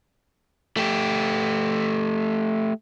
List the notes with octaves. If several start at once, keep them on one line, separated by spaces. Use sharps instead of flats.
A3 G4